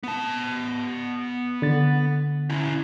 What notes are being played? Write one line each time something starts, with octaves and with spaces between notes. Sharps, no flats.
B3 A5
D3 A6
C#4 E4